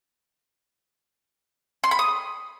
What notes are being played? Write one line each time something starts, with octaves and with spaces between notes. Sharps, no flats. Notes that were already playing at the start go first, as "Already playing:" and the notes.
C6
B5
D#6